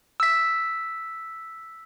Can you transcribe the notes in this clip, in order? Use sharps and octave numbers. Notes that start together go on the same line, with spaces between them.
E6 B6